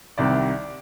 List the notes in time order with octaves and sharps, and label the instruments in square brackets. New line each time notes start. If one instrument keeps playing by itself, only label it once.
[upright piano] C2 C3 D#3 G3 D5 E5